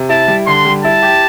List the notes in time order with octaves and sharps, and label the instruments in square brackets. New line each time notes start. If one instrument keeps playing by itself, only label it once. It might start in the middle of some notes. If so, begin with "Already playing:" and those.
Already playing: [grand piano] C3
[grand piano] E4 [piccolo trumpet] A5
[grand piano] G3
[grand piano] D3 [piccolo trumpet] C6
[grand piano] G3
[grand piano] E4 [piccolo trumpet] A5
[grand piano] G4